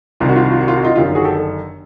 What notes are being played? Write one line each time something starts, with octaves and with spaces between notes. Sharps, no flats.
C2 C3 D#3 F4
F#4
F4
F#4
F4
F#4
F4
F#4
D#4 F4
G1 F#2 D#3 F4 G4
F#4 G#4
G4 A4